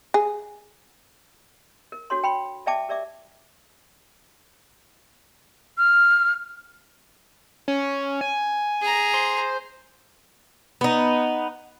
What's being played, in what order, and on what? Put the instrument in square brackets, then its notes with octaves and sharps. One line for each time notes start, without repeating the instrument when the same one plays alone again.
[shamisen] G#4
[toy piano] A#4
D4 F#4 A4 C#5 C6
G5 B5 C6
A4 D5 E5 G5 A5 D6
G4 A#4 D5 E5 D6
[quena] F6
[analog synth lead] C#4
G#5
[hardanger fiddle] G#4 A#5
[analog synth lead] C5
[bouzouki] B3 D#4